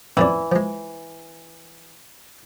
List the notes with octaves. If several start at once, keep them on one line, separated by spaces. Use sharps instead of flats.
A1 F2 E3 D5
F3 G#3